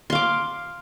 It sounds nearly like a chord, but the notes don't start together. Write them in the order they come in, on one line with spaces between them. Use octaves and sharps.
C6 F5 D6